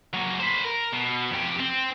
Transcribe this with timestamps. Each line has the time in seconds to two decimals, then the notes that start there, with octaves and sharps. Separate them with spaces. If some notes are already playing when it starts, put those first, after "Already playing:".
0.14 F#3 A#3
0.40 B4 C5
0.64 A#4
0.92 B2
1.31 F2 G4
1.60 C4